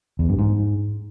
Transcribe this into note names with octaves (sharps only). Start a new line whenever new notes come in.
E2
G2
G#2